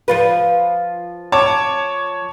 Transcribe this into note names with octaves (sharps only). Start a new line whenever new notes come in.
F3 F4 B4
C#5 A5 D6